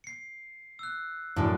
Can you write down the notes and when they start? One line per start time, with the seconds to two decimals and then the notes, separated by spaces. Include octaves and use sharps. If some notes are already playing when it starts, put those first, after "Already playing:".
0.04 C7 C#7
0.79 E6 F#6
1.36 F#2 A2 A3 D4